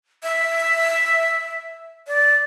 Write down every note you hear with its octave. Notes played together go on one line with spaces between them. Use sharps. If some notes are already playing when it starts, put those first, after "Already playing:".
E5
D5